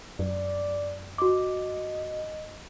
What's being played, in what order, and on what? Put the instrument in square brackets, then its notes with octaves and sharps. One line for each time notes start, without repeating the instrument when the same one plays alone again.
[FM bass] F#2 [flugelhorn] D5
[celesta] F#4 D6 [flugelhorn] D#5